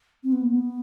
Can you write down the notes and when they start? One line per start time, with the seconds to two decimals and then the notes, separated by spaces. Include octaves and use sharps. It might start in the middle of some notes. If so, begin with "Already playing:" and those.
0.23 C4
0.32 B3
0.41 A#3
0.50 B3